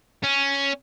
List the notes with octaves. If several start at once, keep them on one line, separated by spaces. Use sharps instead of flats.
C#4